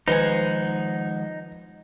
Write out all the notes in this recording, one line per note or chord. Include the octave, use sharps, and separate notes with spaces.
D#3 F3 G#3 D#4 B4 C5 F#5 G#5